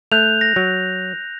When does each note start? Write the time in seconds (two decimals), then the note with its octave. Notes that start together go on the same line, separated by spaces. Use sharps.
0.12 A3 F#6 G6 F7
0.41 A#6
0.56 F#3